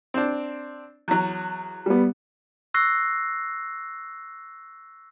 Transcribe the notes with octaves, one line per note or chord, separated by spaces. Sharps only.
C4 D4
E2 F#3
G3 B3
C#6 E6 F#6 A#6 C7